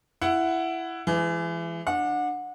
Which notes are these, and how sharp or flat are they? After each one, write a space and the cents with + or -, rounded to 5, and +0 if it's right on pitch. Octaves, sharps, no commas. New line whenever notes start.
E4 +15 F#5 +0
E3 +30 G#3 +0
D4 +20 F#5 -25